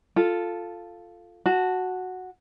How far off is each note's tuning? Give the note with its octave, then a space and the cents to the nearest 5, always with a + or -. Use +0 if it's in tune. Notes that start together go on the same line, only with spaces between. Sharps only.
F4 +0 A4 +0
F#4 -5 A5 +0